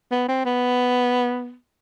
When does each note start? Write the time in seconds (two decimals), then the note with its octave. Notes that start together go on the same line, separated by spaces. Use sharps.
0.11 B3
0.28 C4
0.45 B3